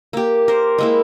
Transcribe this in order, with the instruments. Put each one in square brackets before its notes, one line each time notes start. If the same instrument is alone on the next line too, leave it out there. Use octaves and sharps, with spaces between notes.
[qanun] A#3 G4
A#4 C5
G#3 A#3 E4